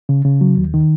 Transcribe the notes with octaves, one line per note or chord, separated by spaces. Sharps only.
C#3
C#3
F#3
D#2
D#3